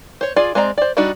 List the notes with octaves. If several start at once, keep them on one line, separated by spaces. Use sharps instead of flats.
C5 C#5
F4 G#4 D5
G#3 C4 D5 A#5
C5 D5
G3 D4 D#4 F#4